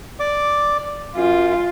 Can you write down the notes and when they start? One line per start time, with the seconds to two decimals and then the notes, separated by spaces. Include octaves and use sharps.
0.20 D5 D6
1.16 F#2 F4